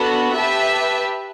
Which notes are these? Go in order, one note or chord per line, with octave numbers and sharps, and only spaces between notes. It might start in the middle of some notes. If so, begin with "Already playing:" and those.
Already playing: B3 D4 F#4 A4
G4 B4 E5 A5